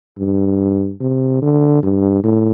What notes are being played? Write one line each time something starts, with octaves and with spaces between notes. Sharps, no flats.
G2
C3
D3
G2
A2